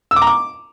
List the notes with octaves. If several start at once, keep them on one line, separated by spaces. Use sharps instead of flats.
E6
D6
A#5
D6